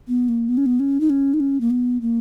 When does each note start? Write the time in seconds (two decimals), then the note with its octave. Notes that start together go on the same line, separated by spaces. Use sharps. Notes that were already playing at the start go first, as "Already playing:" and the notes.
0.08 B3
0.29 A#3
0.49 B3
0.57 C#4
0.66 B3
0.80 C#4
1.00 D#4
1.10 C#4
1.34 D#4
1.40 C#4
1.61 A#3
1.70 B3
2.01 A#3